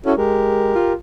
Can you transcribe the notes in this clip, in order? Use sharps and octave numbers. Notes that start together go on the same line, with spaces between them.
C#4 E4 F#4 A4
G#3 G4 A#4
F4